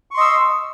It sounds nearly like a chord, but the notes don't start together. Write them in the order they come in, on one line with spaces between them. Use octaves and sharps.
C#6 C6 D#5 E6